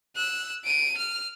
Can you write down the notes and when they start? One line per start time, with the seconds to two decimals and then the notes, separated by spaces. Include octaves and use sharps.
0.16 E6 F#6
0.65 D7 D#7
0.97 F6